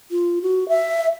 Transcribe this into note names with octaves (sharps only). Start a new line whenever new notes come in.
F4
F#4
E5